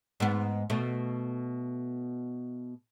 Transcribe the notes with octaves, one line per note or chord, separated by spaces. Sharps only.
G#2 B3
B2 A3